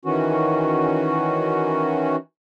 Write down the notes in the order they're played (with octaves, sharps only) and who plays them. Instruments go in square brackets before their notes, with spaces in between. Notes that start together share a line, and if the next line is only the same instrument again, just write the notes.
[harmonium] D#3 E3 C#4 F#4